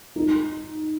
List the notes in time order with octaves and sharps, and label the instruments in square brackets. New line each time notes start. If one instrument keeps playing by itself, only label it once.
[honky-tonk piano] D#4